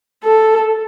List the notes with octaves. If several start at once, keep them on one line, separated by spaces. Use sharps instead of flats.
A4